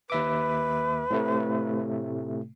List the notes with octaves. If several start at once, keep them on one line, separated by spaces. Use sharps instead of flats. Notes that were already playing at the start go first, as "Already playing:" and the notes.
D#2 B4 E5 D6
A2 C3 A3